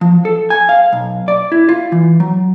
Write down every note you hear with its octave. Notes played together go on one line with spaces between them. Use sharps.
F3
A4
G#5
F5
B1
D5
E4
F4
E3
F#3